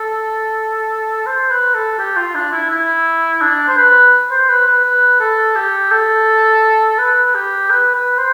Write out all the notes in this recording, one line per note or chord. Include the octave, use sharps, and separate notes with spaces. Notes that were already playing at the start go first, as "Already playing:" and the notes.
Already playing: A4
C5
B4
A4
G4
F4
D4
E4
E4
D4
C5
B4
C5
B4
B4
B4
A4
G4
A4
B4
G4
B4
B4
C5